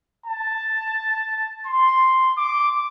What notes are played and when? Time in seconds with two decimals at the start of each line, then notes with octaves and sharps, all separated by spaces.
0.26 A5
1.67 C6
2.37 D6